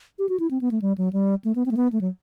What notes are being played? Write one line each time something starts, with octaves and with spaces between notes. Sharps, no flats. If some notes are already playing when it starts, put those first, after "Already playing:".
G4
F#4
E4
C4
B3
A3
G3
F#3
G3
A3
B3
C4
A3
B3
A3
F#3